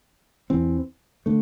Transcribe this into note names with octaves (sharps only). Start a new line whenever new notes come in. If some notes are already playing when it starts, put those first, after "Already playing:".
E2 E3 C4
D3 A3